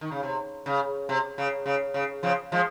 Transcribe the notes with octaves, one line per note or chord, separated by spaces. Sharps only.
D#3
C#3
C3
C#3
C3
C#3
C#3
C#3
C#3 F3
F3 G#3